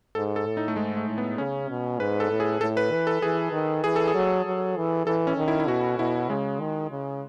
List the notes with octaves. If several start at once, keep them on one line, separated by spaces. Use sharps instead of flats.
G#2 A4
A4
A2
D#4
A3
G#2 G#3
A3
A2
B3
C#3 C#4
B2
G#2 B4
A4
A2
G#4
A2 A4
B4
E3
A4
E3 G#4
D#3
E3 G#4
A4
G#4
F#3
F#3
E3
E3 A4
C#4
D#3
E4
E4
B2 F#4
B2 E4
C#3 G#3
D#3
C#3